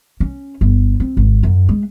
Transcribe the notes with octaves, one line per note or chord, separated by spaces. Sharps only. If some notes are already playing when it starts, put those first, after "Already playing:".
C#4
G1
C4
G#1
F#2
G#3